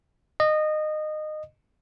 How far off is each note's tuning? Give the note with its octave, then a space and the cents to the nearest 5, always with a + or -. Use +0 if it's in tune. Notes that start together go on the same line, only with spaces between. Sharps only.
D#5 -20